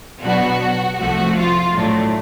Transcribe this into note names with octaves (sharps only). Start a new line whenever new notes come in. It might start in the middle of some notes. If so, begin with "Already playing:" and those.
B2 F#3 B3 D4 F#4
C2 C3 F3 A3 F#4
F4
A2 F#3 A3 D4